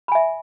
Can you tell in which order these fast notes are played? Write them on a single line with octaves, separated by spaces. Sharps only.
B5 G#5 E5